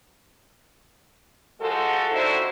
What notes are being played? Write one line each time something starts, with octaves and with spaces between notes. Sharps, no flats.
F3 G#3 F#4 A4
F2 D3 D#4 E4 F#4 C5